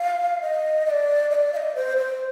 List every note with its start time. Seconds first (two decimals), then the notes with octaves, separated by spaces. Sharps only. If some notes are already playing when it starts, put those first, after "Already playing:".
Already playing: F5
0.41 D#5
0.86 D#5
0.90 D5
1.30 D#5
1.35 D5
1.53 F5
1.57 D#5
1.75 C5
1.97 C5